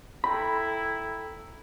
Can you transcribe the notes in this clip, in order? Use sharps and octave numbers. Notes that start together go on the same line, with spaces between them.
E4 A4 G5 A#5 B5